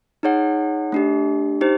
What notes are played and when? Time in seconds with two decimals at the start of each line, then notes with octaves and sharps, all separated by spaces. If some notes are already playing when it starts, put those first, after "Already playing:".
0.23 D#4 G#4 C#5 F#5
0.92 A3 D4 G4
1.61 D#4 G4 C5